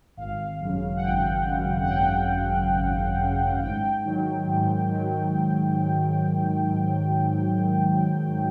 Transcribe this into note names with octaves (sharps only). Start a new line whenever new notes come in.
G#1 F5
F#2 C#3
F#5
G#1 G5
F#2 C#3
F#5
G#1 G5
F#2 C#3
G#1
F#2 C#3
G#2 G5
D#3 F#3
G#2
D#3 F#3